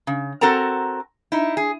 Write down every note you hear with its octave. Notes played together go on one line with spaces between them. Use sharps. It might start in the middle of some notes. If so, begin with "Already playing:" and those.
C#3
C4 F#4 A4 A#4 A5 A#5
D#4 E4
G#4